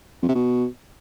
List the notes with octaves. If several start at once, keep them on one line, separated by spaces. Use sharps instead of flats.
F2
C3
B2